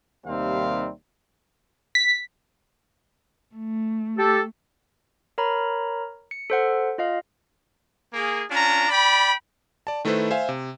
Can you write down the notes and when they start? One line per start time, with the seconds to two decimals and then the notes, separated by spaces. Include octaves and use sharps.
0.25 D#2 C3 D#3 G3 C4 F5
1.95 B6
3.56 A3
4.17 G4 A4
5.38 A#4 C#5 A#5 B5
6.31 C#7
6.50 A4 C5 F#5
6.98 F4 D#5 F5
8.14 A#3 G#4
8.51 C#4 D4 F4 A#5
8.88 D5 G5 B5
9.87 D5 A5
10.05 D#3 A3 E4 A4 B4 C5
10.31 C5 E5 F5 G#5
10.49 C3